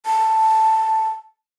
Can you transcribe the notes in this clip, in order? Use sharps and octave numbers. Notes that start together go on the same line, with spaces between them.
A5